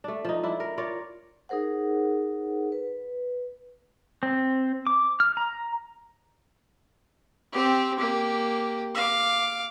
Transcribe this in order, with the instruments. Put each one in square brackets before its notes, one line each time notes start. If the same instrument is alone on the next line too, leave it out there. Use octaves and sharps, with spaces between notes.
[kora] A3 D4
F3 D#4
D4 E4
A#4
F4 A#4 C#5 D5
[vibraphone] D#4 G#4 A#4 C5 F#5
B4
[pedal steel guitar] C4
D6
F6
A#5
[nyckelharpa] C4 G4
A#3 G4
F5 D6